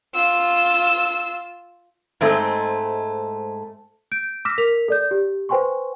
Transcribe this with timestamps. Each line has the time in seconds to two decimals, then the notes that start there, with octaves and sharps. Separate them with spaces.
0.15 F4 E6
2.21 G#2 G#3 A3 C4
4.12 G6 D7
4.45 D6 E6 F6 A#6 B6 E7
4.58 A#4 B6 F7
4.88 A4 D5 G6
5.11 G4
5.49 B4 C5 G5 G#5 C6 C#6